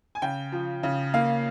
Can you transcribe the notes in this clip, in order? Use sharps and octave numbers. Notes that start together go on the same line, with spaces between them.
G#5
C#3 G5
F3
C#3
A#3 F5